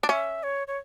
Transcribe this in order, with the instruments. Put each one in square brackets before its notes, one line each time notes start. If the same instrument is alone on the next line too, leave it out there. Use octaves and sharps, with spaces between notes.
[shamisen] D4
[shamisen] C#4 [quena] E5
[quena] C#5
C#5